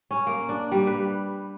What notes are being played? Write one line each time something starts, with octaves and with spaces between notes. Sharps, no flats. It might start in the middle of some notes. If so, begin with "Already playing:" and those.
C#4
A#3
D4
G3
B4